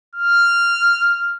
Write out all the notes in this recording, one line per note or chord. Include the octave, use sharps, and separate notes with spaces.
F6